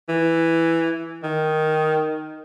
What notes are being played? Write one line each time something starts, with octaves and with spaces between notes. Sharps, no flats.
E3
D#3